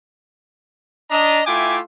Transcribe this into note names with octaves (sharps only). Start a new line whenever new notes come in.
D4 D#5 A#5
A3 E4 F4 G5 G#5 D6